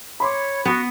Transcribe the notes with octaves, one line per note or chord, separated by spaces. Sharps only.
C#5 B5 C6 D6
B3 F#4